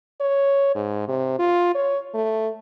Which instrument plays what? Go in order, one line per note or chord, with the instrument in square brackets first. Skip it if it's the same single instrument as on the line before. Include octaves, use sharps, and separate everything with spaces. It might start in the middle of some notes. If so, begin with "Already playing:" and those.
[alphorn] C#5
G#2
C3
F4
C#5
A3